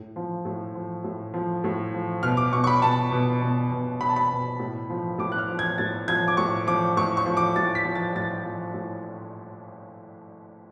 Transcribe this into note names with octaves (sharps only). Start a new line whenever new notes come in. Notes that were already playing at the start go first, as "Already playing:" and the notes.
Already playing: A2
F3
A2
F3
A2
F3
A2
F3
B2 F6
D6
B2 C#6
C#6
B5
B2 A5
B2
B2
B2
B2 B5
A5
B5
B2
A2
F3
A2 D6
F#6
F6
F3
G#6
A2 A6
F3 G#6
D6
A2 C#6
F3 D6
A2 C#6
C#6
F3
D6
A2 A6
B6
F3
A6
A2 A6
F3
A2